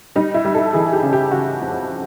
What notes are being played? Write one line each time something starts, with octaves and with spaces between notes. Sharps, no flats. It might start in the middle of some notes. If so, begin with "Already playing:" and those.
G3 D#4
E4
G3
A4
E3 G#4
G4
C#3
G4
C#3 F#4
F2